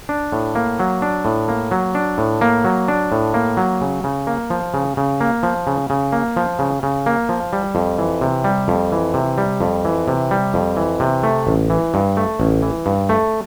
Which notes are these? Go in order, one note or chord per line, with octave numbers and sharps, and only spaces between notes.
D4
A2
A#3
F#3
D4
A2
A#3
F#3
D4
A2
A#3
F#3
D4
A2
A#3
F#3
C#3
C#3
A#3
F3
C#3
C#3
A#3
F3
C#3
C#3
A#3
F3
C#3
C#3
A#3
F3
G3
F2
E3
C3
G3
F2
E3
C3
G3
F2
E3
C3
G3
F2
E3
C3
A3
A1
E3
G2
A3
A1
E3
G2
A3